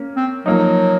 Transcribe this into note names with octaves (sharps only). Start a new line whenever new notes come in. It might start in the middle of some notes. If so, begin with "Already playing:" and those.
Already playing: A#3 C#4
C4
F3 F#3 A#3 D#4